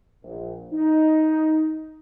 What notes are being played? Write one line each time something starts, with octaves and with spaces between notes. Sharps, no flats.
A#1
D#4